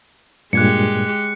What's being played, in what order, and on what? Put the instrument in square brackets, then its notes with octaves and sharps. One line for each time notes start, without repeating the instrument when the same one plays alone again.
[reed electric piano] G2 A#2 G#6 [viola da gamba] G#3 G4 [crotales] F#6 C#7